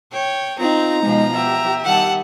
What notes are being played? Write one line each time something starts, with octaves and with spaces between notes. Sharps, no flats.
C#5 G5
C4 D#4 F4 A#5
B2 F3 G#3
B3 G4 E5
D#3 G3 F#5 A5